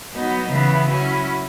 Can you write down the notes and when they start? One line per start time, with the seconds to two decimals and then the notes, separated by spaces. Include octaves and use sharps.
0.13 F#3 B3 D#4
0.49 C#3 E3 B3 E4
0.87 F#3 C#4 E4